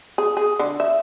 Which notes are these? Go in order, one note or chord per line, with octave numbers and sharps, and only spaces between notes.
G#4
G#4
D3
E5